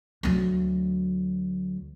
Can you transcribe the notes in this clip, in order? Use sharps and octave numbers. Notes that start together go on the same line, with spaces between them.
D2 F#3